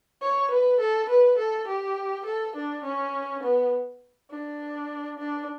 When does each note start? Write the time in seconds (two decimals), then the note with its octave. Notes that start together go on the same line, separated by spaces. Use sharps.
0.21 C#5
0.50 B4
0.80 A4
1.09 B4
1.38 A4
1.68 G4
2.26 A4
2.56 D4
2.84 C#4
3.43 B3
4.31 D4
5.19 D4